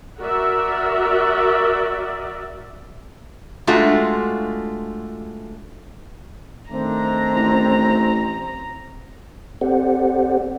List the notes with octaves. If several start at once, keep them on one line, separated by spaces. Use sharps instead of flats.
F#4 A#4 D5 E5
G#3 A3 D4 F4 F#4
D#3 A3 C4 D4 A#5
A1
C4 G4 A4 C5 D5 F#5